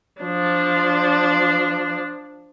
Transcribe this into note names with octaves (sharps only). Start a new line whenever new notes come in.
F3 D4